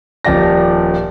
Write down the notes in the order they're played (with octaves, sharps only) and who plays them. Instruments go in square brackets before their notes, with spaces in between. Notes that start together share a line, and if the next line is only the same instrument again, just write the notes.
[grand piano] D#1 F3 G4 D5 A#6